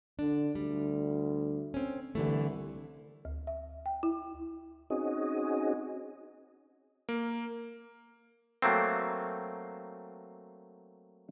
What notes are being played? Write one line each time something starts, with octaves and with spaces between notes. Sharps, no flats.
D3 D4
D2 G3
C4 C#4
C2 D3 E3 A3
D2
E5
G5
E4
C4 C#4 D#4 F#4 G#4 D#5
A#3
F#3 A3 A#3 C4